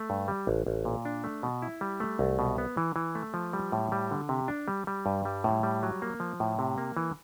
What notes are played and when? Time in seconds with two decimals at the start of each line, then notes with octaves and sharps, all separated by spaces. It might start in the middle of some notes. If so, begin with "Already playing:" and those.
Already playing: A3
0.10 G2
0.28 G3
0.47 A1
0.67 A1
0.85 A#2
1.05 D4
1.24 A3
1.43 B2
1.62 E4
1.81 G3
2.00 A3
2.19 C2
2.39 B2
2.58 B3
2.77 E3
2.96 E3
3.15 A3
3.34 F3
3.53 G3
3.72 A2
3.92 G3
4.11 D3
4.29 C3
4.48 D4
4.68 G3
4.87 G3
5.06 G2
5.25 G3
5.44 A2
5.63 G3
5.83 F#3
6.02 A#3
6.20 F3
6.40 A2
6.59 C3
6.78 A#3
6.97 E3